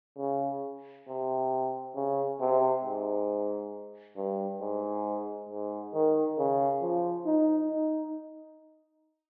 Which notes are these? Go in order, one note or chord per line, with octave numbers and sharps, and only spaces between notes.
C#3
C3
C#3
C3
G#2
G2
G#2
G#2
D#3
C#3
F3
D#4
D#4